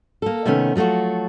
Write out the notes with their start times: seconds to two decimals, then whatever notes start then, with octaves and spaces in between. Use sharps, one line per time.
0.22 A#3 A4
0.46 C3 D#3 A3 B3 C#4
0.75 F3 F#3 A3 F4 F#4